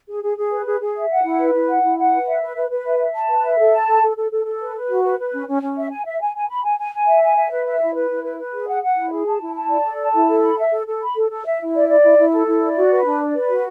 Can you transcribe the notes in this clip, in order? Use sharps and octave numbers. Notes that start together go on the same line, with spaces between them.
G#4
G#4
G#4
B4
G#4
G#4
E5
F#5
E4
B4
E4
F#5
E4
F#5
B4
E5
B4
B4
B4
E5
E5
A5
B4
E5
A4
A5
A4
A4
A4
A4
A4
B4
B4
F#4
B4
B4
C#4
C#4
C#4
E5
G#5
E5
G#5
G#5
B5
G#5
G#5
G#5
E5
G#5
E5
B4
E5
E4
B4
E4
B4
B4
G#4
F#5
F#5
E4
G#4
A5
E4
A5
D5
A4
A5
E4
A4
B5
E5
A4
A4
B5
A4
A4
E5
E4
D5
D5
E4
E4
A4
E4
D5
F#4
B4
D4
D5
B4
F#4